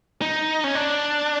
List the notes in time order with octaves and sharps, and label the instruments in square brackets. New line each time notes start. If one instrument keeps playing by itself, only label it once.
[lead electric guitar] D#4
C#4
D4